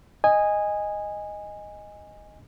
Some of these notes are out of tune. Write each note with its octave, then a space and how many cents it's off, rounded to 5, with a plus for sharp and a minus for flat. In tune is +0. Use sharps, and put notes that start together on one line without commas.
D#5 +0 G#5 -15